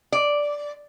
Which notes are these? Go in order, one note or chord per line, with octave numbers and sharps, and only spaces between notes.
D5